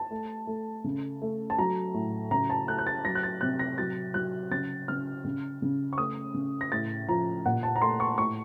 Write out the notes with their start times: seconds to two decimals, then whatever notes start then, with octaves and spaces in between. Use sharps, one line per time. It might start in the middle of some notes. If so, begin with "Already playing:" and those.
Already playing: A5
0.11 A3
0.47 A3
0.84 C#3
1.22 A3
1.50 A5
1.59 F#3 A#5
1.94 A2
2.31 C#3 A#5
2.50 A5
2.68 A3 F#6
2.78 F#6
2.87 A6
3.05 F#3 A#6
3.15 F#6
3.23 A6
3.41 C3 F#6
3.59 A#6
3.78 F#3 A6
4.14 F#3 F#6
4.51 C#3 A6
4.88 C#3 F6
5.25 C#3
5.62 C#3
5.93 C#6
5.98 A3 D#6
6.34 C#3
6.61 A#6
6.72 A2 A6
7.08 F3 A#5
7.45 A#2 F#5
7.63 A5
7.76 A#5
7.81 A3 C6
8.00 C#6
8.18 A2 C#6